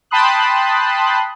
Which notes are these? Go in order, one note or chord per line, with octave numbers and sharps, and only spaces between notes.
G5 A5 B5 C6 D#6 F#6